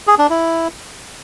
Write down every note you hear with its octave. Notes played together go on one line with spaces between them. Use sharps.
G#4
D4
E4